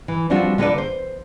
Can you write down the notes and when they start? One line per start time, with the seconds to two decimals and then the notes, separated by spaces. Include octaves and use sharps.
0.08 E3
0.30 F3 G3 C4 D4 F4 F#4
0.58 D3 A#3 B3 F4 B4 D5
0.78 C5